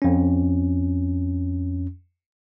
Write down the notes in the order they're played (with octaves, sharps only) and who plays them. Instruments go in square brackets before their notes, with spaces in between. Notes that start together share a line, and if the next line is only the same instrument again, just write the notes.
[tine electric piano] F2 C#4